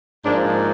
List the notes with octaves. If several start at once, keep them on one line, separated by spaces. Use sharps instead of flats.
G#2 F3 A#3 D4